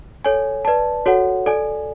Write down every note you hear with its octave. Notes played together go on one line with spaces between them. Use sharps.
A4 C#5 G#5
B4 D5 A5
F#4 A4 C#5 F#5
A4 D5 G#5